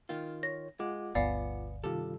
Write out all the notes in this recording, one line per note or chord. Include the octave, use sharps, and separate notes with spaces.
D#3 F4
C#5 A#6
G#3 F4 F#5 D6
G1 D2 G2 B3 D5 F5 G#5
G2 C3 D#3 F4 G4 A4